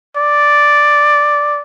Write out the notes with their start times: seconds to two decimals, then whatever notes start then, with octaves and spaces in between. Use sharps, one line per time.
0.16 D5